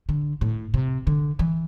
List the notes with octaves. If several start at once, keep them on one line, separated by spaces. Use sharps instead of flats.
D3
A2
C3
D3
E3